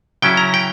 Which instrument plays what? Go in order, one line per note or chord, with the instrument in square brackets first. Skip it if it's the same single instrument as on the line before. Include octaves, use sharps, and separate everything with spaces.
[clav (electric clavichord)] C#3 F#3 C#4 E4 G5
A#5
G5